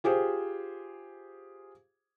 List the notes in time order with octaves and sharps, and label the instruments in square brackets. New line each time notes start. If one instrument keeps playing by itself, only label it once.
[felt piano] F4 G4 G#4 C5